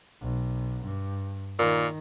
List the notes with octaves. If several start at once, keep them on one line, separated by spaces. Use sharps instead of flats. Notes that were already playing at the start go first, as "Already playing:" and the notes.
B1
G2
A#2 D#3